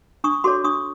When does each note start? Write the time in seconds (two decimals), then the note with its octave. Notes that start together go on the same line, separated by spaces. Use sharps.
0.24 D4 C#6 D#6
0.44 F#4 A4 C#5 C6 D6
0.64 D4 C#6 D#6